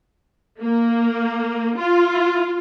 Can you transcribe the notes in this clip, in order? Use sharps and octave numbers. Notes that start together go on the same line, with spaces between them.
A#3
F4